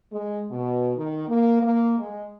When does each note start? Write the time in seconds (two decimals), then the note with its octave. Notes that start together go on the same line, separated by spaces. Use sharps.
0.12 G#3
0.50 B2
0.96 D#3
1.28 A#3
1.61 A#3
1.98 G#3